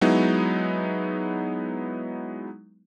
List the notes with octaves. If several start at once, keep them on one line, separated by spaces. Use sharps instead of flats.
F#3 G#3 B3 D#4 E4